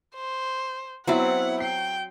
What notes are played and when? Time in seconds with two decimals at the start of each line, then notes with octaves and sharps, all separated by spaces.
0.16 C5
1.07 F#3 B3 C4 E4 D5 F#5
1.60 G5 C7